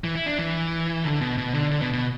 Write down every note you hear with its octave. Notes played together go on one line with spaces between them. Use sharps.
E3
E4
D4
E3
D3
B2
B2
D3
D3
B2
B2